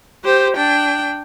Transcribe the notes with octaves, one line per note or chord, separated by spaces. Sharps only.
G4 C5
D4 G5